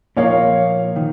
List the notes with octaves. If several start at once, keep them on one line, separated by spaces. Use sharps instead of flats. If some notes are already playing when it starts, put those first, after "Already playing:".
A#2 F3 A#3 C#5 F5
D#3